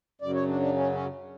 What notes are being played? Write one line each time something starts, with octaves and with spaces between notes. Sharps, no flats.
F#2 C#3 F#3 D5
C#5
D4
D4
C#4
C#4